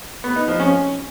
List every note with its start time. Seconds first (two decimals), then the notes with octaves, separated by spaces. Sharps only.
0.24 B3
0.36 D#4
0.48 F3
0.60 C#4